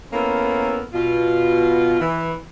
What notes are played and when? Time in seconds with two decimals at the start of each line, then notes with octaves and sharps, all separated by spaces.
0.13 A#3 B3 C#4 E4 A4 A#4
0.93 B2 F4
2.00 E3